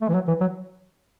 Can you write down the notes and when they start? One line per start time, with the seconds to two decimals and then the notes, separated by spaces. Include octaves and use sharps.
0.01 A3
0.09 E3
0.14 F#3
0.28 E3
0.41 F#3